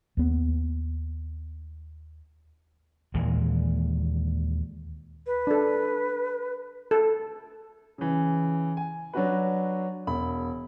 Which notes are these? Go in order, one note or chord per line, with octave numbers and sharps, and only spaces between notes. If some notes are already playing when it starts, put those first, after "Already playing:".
D#2 B3
D#2 A#2 E3 G#3
B4
D4 A4
A4
C#3 E3
G#5
F#3 D4 F#4 B4
E1 B5